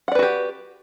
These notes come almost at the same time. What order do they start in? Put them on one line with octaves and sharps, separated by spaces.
F#5 D5 B4 F#4 G4